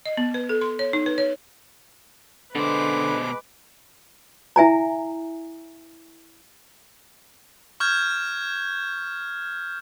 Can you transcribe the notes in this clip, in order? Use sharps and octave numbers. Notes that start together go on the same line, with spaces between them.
D#5
B3
B4
A4
C6
C#5
D#4
B4
C#5
B2 D3 G#3 B4 C5 D6
E4 E5 G#5 A#5
C#6 F6 G6 G#6